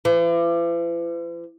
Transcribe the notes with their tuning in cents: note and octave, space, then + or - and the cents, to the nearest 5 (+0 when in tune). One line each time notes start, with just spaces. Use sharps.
E3 +45